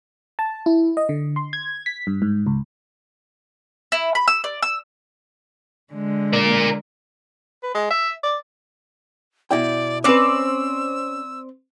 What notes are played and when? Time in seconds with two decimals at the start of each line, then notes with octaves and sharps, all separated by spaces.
0.39 A5
0.66 E4
0.97 D#5
1.09 D3
1.36 C6
1.53 G#6
1.86 B6
2.07 G2
2.22 G#2
2.46 C#2
3.92 E4
4.15 B5
4.28 E6
4.44 D5
4.62 E6
5.93 D3 G#3
6.33 A#4 D5
7.63 B4
7.74 G#3
7.90 E5
8.23 D5
9.51 B2 E4 D5 G5
10.04 C4 C#4 B4 D5 E6